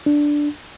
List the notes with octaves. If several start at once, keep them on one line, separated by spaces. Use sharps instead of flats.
D4